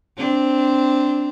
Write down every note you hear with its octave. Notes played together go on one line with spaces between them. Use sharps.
C4 D4